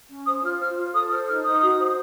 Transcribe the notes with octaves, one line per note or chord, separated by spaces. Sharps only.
C#4
C5 D#6
F4 F6
C5 F6
F4
A4 D#6
C5 F6
D#4 F6
D#4 D#6
F#4
C5